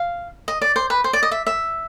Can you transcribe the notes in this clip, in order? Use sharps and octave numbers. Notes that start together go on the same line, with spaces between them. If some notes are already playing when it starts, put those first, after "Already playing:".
Already playing: F5
D#5
D5
C5
B4
C5
D5
D#5
E5
E5